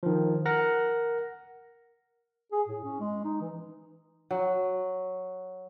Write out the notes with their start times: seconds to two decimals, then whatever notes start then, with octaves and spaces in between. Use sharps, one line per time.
0.03 D#3 F3
0.46 A#4 F#5 A#6
2.52 G#4
2.68 A2
2.84 C#4
3.00 G#3
3.24 D#4
3.41 E3
4.31 F#3